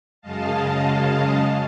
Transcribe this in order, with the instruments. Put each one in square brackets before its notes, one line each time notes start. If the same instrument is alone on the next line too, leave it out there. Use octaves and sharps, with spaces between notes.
[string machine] F#2 C#3 G#3 D#5 F5 A5